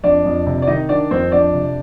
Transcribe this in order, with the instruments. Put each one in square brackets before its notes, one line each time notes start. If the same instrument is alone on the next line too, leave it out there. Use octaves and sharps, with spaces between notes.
[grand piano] F2 [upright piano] D4 D5
[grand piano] F2
C3
[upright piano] D5
[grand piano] D#3 [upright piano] D#4 D#5
[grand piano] D#3 [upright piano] D4 D5
[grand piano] F2 [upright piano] C4 C5
[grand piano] F2 [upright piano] D4 D5
[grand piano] C3